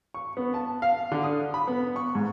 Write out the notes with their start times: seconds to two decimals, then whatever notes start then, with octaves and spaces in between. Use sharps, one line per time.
0.14 C#6
0.37 B3
0.54 A5
0.82 F5
1.12 D3
1.23 D#6
1.54 B5
1.67 B3
1.96 C#6
2.15 G#2